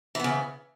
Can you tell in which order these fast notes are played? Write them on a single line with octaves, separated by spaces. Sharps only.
E3 B3 C#3